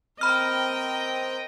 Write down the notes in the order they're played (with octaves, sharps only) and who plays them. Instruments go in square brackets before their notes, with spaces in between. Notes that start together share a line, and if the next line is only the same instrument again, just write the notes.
[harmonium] C4 A#5 [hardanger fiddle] A#4 G5 [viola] D#5 [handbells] B5 F6